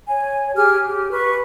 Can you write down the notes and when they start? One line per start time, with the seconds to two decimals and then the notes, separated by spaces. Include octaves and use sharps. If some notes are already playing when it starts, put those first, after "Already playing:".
0.08 C#5 G#5
0.56 G4 G#4 G#5 F6
0.86 G4
1.12 B4 C#6